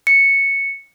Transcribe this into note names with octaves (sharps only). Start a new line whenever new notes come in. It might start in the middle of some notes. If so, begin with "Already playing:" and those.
C#7